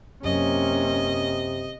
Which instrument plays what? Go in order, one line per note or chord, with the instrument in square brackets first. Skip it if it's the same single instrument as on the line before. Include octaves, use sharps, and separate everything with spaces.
[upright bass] F#2 [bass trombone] C3 [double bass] A#3 C#4 [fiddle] D#5